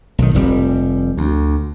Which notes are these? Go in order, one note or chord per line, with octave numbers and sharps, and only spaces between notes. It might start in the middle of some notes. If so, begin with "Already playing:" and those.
B1 D#3
F1 F2 G3
D2